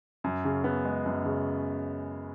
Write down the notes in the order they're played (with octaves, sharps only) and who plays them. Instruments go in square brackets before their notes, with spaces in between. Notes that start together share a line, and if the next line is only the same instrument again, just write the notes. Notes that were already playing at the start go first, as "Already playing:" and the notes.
[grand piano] F#2
C#3
B3
G#3
F#2
C#3